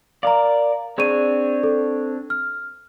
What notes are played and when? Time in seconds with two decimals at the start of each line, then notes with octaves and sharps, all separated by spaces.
0.23 A#4 D5 F5 A#5
0.98 C4 D4 G#4 C#5 D#7
1.63 A4
2.30 F6